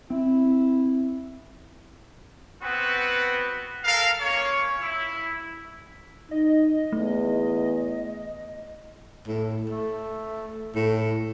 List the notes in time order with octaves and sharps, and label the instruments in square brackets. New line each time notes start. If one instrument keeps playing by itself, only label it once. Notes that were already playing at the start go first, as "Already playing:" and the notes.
[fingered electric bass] C4 [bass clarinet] E4
[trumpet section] B3 C4 F#4 B4
A4 A#4 F5
A#3 C#4 C#5
E4
[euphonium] D#4 [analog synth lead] D#5
[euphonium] E2 [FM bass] A3
[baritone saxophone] A2
A3
A2